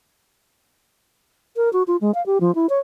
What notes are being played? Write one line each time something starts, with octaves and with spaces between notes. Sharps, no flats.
A#4
F#4
F4
G#3
F5
G4
F3
E4
C#5